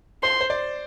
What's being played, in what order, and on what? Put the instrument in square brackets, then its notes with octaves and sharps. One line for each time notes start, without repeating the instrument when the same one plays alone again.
[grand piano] C5 [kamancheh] C6
[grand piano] C5
D5